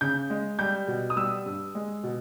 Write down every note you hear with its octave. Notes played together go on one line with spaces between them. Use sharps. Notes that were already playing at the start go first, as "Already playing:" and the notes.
C#3 G6
G#3
G3 G6
B2
D#6
G3 E6
G2
G#3
B2